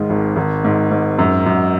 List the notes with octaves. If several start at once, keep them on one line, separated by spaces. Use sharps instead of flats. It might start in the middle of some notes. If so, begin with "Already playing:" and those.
Already playing: G#2 D#3 G#3
G#1
G#1
G#2
G#2
F#2
F#2